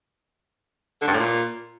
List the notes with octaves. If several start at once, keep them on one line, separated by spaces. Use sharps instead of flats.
D3
G2
A2
A#2